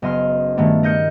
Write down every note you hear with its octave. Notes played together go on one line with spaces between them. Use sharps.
F#1 B3 D#5 C6 F6
G2 D#3 A3 B3 D4
A#4 D#5 G6 C#7